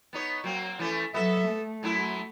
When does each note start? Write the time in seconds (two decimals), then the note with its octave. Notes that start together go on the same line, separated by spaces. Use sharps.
0.13 B3 D#4 C#5
0.44 F#3 A#3 C4
0.79 E3 A3 C#4
1.14 F#3 B3 A4 E5
1.48 A3
1.83 F#2 F#3 E4